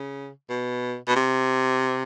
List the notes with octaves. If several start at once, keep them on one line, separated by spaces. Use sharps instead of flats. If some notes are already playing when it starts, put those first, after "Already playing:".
Already playing: C#3
B2
B2
C3